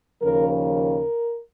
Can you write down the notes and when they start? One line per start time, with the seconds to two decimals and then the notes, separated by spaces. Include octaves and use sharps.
0.22 D#2 C#3 F3 A#4
0.50 A#4